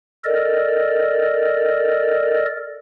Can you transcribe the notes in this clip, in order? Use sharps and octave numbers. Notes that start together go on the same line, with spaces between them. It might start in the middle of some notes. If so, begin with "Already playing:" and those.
A4 A#4 D5 D#5